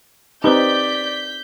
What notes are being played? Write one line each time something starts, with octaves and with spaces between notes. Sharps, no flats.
C4 D#4 G4 B4 C5 D5 G6 B6